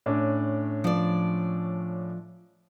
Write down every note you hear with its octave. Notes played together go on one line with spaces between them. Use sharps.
A2 C#4 D4
F3 D5